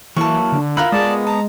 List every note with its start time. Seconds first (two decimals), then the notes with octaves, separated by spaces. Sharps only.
0.17 E3 F#3 A#3 E4 A5 C#6
0.52 D3
0.77 E4 F4 A#4 F#5 B5
0.92 G#3 B3 D5 A5 D#6
1.27 A5 A#5